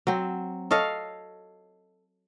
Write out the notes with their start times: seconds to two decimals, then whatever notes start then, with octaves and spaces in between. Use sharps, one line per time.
0.07 F#3 C4
0.71 A4 C#5 D#5 F5